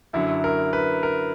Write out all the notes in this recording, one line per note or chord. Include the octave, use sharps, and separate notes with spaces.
F#2 D3 F#3 E4
A#4
B4
A#4